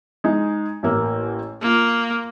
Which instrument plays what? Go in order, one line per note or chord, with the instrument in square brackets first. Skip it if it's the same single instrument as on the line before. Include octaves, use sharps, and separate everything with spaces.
[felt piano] G#3 D#4
A1 A#3 E6
[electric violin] A#3 [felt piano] F4